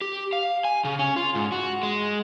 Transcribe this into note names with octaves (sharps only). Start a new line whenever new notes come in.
G4
F5
G#5
C#3
C#4
F4
G#2
F#4
G#3